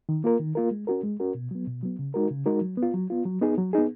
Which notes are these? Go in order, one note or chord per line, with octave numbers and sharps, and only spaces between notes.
D#3
A#3 F4 A#4
D#3
A#3 F4 A#4
G#3
C#4 F#4 A#4
G#3
C#4 F#4 A#4
B2
F#3 B3
B2
F#3 B3
C#3
G#3 D#4 F#4 A#4
C#3
G#3 D#4 F#4 A#4
F#3
B3
F4
F#3
B3 F4
F#3
B3 D#4 G#4
F#3
B3 D#4 G#4